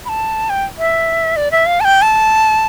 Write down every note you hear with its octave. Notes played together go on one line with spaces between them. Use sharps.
B5
A5
G5
E5
D5
E5
F5
A5
G5
A5